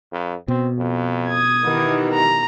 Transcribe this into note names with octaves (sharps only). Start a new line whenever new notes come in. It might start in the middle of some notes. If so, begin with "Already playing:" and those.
F2
B2 C4
F2
D#6 G#6
D#3 E3 B3 G4
A#5